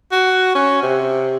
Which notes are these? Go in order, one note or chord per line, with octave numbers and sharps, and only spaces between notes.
F#4
C#4
C3